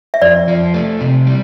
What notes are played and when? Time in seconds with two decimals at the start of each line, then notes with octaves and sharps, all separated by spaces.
0.14 E5
0.22 F2 D5
0.48 F3
0.74 A3
1.01 C3
1.27 G3